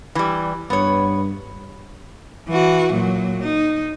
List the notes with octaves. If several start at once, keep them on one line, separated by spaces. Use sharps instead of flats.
E3 G3
G2 B3 C#5
E3 F#4
A#2 F#3
D#4